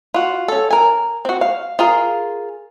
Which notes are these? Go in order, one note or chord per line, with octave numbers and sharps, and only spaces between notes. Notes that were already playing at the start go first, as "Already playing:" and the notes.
F4 F#4
C#4 A4
A#4 G#5
C4 F#4
F5
F4 G#4 A#4